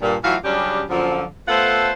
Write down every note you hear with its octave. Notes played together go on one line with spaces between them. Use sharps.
G2 A#2
E3 F#3 A3 F4 F#4 F5
C#3 F#3 G3 C#4 D4 G4
F#2 A#2 D3 F3
A3 B3 F4 A4 C5 F#5